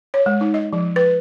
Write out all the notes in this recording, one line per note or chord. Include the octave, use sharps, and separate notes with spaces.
C#5
G#3
D#4
D#5
F3
B4